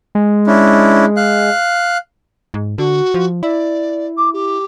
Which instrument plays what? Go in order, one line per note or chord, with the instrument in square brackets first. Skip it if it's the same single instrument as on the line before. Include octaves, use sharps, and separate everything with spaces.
[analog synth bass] G#3
[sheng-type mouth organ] C#4 D4 E4
F5 F#6
[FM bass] G#2
[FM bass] D3 [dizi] F#4
[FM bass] F3
[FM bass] E4 [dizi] D5
[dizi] D6
G4